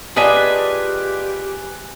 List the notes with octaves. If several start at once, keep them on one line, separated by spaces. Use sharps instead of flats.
D4 F4 G4 G#4 B4 D#5 G#5